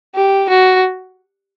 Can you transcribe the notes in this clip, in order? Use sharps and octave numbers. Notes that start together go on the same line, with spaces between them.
G4
F#4